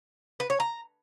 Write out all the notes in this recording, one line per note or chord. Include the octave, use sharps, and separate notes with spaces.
B4
C#5
A#5